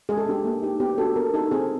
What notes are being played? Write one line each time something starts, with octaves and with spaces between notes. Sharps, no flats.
G#3 G#4
A4
B3 D4 G4
A#3
D#4 G4
B3 G4
D4 F#4 A4
B3 A#4
D#4 G4 A4
C4 G#4